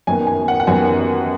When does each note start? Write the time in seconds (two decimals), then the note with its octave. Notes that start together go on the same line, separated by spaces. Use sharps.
0.07 F#2 D#3 B3 G#5
0.27 G#5
0.48 F#5
0.60 F#5
0.67 F#2 D#3 B3 G#5